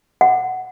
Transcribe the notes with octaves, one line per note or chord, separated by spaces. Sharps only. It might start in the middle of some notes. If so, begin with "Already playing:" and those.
F#5